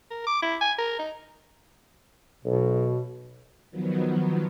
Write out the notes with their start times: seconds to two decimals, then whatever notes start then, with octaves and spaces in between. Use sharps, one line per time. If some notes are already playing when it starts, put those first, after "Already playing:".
0.11 A#4
0.27 D6
0.42 E4
0.61 G#5
0.78 A#4
0.99 D#4
2.45 B1 B2
3.70 D#3 F3 F#3 B3